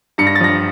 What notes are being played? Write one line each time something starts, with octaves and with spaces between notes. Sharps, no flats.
G2 C#7
A#6
A6
F3 A#6